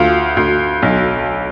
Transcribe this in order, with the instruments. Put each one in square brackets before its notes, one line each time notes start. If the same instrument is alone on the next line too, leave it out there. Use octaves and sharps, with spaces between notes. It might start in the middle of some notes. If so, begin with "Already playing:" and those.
Already playing: [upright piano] D2 F4
D2
B1